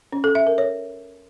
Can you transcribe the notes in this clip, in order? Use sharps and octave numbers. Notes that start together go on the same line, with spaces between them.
C#4
A4
E5
A#4
C#5